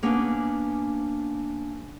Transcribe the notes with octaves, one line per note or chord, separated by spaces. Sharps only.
A#3 B3 C#4 D4